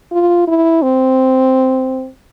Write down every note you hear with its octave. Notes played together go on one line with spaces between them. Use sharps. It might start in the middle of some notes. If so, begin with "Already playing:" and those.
F4
E4
C4